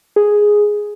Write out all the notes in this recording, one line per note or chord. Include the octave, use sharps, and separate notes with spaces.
G#4